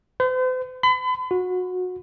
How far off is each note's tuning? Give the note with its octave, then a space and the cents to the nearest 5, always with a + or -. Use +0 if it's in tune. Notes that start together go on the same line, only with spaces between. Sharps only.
C5 -45
B5 +40
F#4 -25